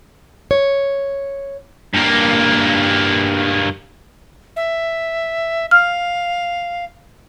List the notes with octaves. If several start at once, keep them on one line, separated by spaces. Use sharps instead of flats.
C#5
G2 A#3
E5
F5 F6